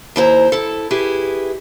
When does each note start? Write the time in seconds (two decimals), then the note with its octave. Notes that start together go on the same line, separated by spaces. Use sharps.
0.16 D#2 E4 C5 A#5
0.52 E4 A4
0.91 E4 G4 G#4 B4